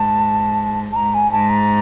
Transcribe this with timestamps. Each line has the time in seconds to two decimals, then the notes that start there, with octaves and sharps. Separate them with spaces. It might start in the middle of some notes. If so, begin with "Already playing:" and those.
Already playing: G#2 A5
0.92 A5
0.96 G#2 A#5
1.14 G#5
1.32 G#2 A5
1.50 A#5